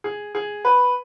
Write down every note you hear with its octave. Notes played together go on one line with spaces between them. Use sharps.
G#4
G#4
B4